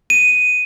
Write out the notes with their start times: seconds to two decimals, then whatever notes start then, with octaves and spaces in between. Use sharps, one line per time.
0.10 D#7